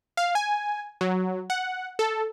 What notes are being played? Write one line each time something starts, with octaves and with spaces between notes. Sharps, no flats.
F5
G#5
F#3
F#5
A4